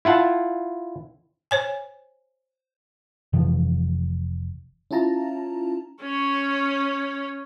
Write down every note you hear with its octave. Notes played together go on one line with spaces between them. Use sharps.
E4 F4 F#5 A5
C5 C#5 G#5
F1 C3 E3 F3
C#4 E4 F4 A5 A#5
C#4 C#5